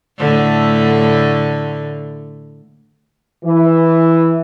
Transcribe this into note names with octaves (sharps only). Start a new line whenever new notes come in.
A2 D3 A3
E3